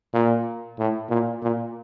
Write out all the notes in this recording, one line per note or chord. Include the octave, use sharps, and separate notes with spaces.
A#2
A2
A#2
A#2